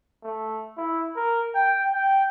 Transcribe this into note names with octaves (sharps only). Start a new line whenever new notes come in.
A3
E4
A#4
G5
G5